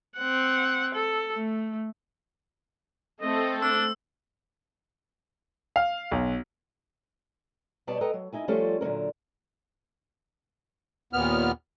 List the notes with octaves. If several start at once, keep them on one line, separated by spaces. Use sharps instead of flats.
C4 F#5
A4
A3
A3 C4 A4 D#5
D4 E6
F5
B1
B2 G3 B3 C#5 D5 A5
A4 B4 D#5 G5 A#5
F#3
D#4 E4 G#5
F3 G3 A3 C#4 F4 A4
A#2 D3 F#3 C#4 A#4
D#2 A#2 B3 F6